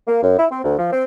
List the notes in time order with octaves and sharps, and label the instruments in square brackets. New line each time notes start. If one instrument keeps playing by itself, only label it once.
[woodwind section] A#3
F#2
E4
C4
D2
F3
C4